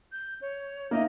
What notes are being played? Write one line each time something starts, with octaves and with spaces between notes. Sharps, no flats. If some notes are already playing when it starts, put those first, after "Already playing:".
G6
C#5
A#3 D#4 D#5 E5